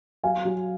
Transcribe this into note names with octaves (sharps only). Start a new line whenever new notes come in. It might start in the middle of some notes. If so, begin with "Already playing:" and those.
F#3 F5 G#5
F#3